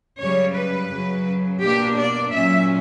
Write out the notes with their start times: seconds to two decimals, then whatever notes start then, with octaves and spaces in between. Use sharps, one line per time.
0.20 F#2 C#3 G3 C#5
0.56 B4
0.92 F#2 C#3 F#3
1.63 B2 A#3 D4 G4
1.98 D5
2.33 A#2 F#3 C#4 E5